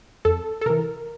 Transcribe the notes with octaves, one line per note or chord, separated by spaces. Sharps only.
F2 A4
A4
C3 E3 A#4